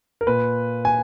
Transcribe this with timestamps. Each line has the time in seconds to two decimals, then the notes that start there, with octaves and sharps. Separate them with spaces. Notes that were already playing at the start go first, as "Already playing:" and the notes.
0.21 A#4
0.27 A#2 B4
0.85 G#5